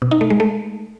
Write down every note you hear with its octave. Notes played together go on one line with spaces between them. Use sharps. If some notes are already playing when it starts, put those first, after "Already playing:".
B2
D#4
A3
G#3
A3